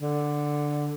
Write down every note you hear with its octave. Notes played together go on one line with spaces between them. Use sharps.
D3